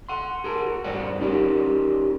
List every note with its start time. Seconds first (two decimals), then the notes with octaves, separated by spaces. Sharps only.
0.09 F#5 C6
0.44 G#4 A#4
0.65 F#4
0.84 G2 C5 D5 F#5
1.20 C#4 D#4 G4 A#4